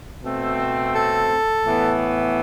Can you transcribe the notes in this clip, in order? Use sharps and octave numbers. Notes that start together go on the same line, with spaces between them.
B2 A3 C4
A4
A2 E3 B3